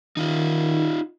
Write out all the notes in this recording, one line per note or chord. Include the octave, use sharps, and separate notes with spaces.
D#3 D#4 F4